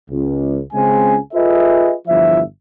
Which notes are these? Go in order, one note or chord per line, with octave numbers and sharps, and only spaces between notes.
C#2
C#2 C#3 G#3 C4 G#4 G#5
F4 G#4 A4 B4 D#5 E5
G1 E2 F3 E4 E5